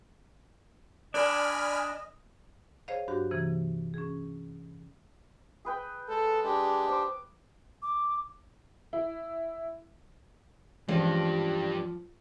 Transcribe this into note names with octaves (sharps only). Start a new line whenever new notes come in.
D4 A#4 D5 D#5 G#5 B5 F6
G#4 C5 C#5 D#5 F5
G2 F#3 D4 F#4 G4
C3 E3 A#3
C#4 G#4
G#4 B4 G5
G#3 A4
G#3 D4 G4
C5 D6
D6
E4
E3 F3 G3 G#3 C#4 D4